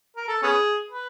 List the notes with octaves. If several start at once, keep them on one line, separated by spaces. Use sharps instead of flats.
A#4
A4
B3 C#4 G#4
B4